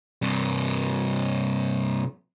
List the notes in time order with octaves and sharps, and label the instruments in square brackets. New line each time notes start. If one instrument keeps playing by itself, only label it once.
[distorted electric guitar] G2 C3